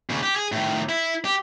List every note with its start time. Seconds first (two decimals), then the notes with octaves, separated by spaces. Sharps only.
0.10 D#2 C#3
0.23 G4
0.36 G#4
0.52 A2 D#3
0.89 E4
1.25 G4